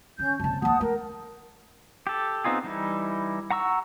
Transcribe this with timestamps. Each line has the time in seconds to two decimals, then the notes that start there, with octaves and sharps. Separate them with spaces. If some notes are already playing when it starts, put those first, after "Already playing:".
0.19 D#3 C#4 G6
0.40 F#1 C2 A5
0.62 D#2 E3 F#5 A5 D#6
0.81 A3 A#4
2.07 G4 A4
2.45 B3 C4 D#4 F4 G#4
2.64 E3 G3 D#4 E4
3.51 F#5 A#5 C#6 E6